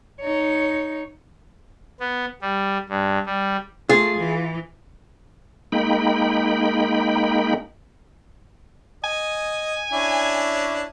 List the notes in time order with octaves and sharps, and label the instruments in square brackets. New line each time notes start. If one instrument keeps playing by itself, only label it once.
[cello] D#4 C#5
[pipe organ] B3
G3
G2
G3
[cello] A3 [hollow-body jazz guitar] F4 [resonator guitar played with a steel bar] G#4
[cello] E3
[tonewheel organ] G#3 A#3 D#4 G5 B5
[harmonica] D#5 [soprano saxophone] G#5
[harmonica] C#4 D4 E4